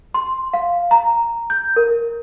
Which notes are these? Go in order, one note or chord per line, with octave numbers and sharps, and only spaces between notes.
C6
F5
A#5
G6
A#4